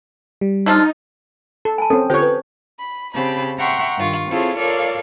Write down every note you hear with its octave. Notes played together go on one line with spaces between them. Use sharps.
G3
D3 F3 D#4 F4
A4
G#5 A5 B5
C4 C#4 A4
D3 F4 G4 C5 C#5 G5
B4
B5
C#3 C4 G4 A5 B5
E5 F#5 G5 A#5 C6 C#6
G2 D#3 F4 C#6
C4 E4 F4 G#4 A4 C#5
F4 A4 A#4 C#5 D5 F5